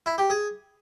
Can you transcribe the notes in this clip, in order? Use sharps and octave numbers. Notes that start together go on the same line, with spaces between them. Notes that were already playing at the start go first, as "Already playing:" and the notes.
E4
G4
G#4